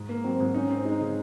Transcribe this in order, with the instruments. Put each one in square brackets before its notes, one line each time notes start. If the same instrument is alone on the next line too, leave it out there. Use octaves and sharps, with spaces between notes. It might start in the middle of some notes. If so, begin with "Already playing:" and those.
Already playing: [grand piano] G#2
A#3
[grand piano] F#3 [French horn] C4
[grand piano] G#2
[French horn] C#4 [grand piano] D#4
[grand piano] C4
[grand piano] G#3 [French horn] D#4
[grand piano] C#3